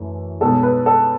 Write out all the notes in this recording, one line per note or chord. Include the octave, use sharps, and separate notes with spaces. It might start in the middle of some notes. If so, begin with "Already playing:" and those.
Already playing: F#2 E3 A3
B1 B2 G#3 A4
B4
A4